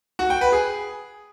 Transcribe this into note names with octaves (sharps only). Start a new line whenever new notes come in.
F#4
G5
B4
G#4